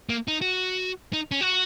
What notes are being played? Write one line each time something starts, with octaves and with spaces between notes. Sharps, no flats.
A#3
D#4
F#4
D#4
C#4
F#4